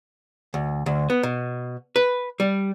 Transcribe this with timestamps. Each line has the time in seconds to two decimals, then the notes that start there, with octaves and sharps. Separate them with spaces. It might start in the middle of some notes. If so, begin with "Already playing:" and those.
0.54 D2
0.86 D2
1.10 B3
1.23 B2
1.96 B4
2.40 G3